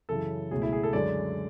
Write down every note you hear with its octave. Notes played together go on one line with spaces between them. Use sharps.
F#2 C#3 E3 A4
C#2 B2 F#3 A3 G#4
E4
G#4
A4
F#2 D3 G#3 D5